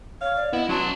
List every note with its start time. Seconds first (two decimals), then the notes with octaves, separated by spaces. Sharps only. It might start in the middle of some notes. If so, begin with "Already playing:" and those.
0.21 C#5 F5
0.36 D5
0.53 B3 E4 D#5
0.69 F#3 C#4 A5 C6